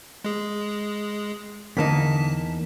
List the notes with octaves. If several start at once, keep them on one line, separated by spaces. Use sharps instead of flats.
G#3 G#4
E2 D3 A#3 D#4 A5 B6